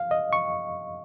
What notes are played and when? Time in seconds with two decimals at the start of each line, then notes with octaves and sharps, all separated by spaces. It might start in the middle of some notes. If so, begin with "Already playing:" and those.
Already playing: F5
0.11 D#5
0.33 C#6